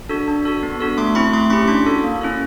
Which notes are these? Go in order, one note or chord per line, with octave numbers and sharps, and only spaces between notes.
D4 F#4 A4
D4
F#4 A4
B3
D4 F#4 A4
A3 C6 D6
C4 E4 B5 C#6
A3 C6 D6
C#4 E4 G4 B5 C#6
D4 C6 D6
F#4 A4
A#3
C#4 E4 A4